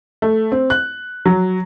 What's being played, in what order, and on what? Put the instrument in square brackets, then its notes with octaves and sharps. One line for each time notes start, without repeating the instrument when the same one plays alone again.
[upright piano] A3
C4
F#6
F#3